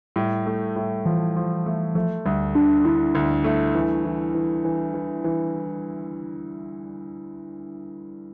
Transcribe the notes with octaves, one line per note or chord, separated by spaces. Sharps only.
A2 G3
A3
A2
E3 F3
F3
A3
F3 A3
D2 G3
D3 D4
D4
D3 E4
D2
A3
E3
E3
E3
E3
E3
E3